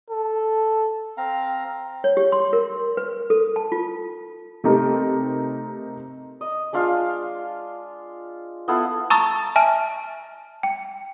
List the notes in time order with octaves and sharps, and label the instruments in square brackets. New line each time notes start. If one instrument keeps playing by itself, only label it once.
[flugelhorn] A4
[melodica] C4 F5 A#5
[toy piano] C#5
G4
C6
A#4
B4
A4
A5
F4
[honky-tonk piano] C3 A3 C4 D#4 G4 A#4
[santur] D#5
G#3 D4 F4 F5
B3 E4 F4 A4
[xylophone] A5 A#5 C#6 D#6 E6 A6
E5 G#5 A5 F6
G5